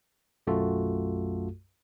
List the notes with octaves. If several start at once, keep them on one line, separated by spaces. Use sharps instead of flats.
B1 F#2 A3 F4 F#4 A4